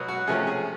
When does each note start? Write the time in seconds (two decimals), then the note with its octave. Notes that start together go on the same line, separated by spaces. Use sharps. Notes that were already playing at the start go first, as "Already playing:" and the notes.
Already playing: B2 F#3 B3
0.08 F#4
0.27 C3 F3 A3 C#4 G#4
0.47 G#4